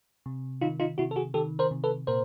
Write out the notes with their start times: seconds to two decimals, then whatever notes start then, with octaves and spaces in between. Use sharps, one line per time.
0.26 C3
0.61 D#3 D#4 F4
0.80 D#4 F4
0.98 C3 E4 F#4
1.11 A4
1.16 F#4 G#4
1.34 D#3 G4 A4
1.59 A#4 C5
1.71 C3
1.84 A4 B4
2.07 A#2 A#4 C5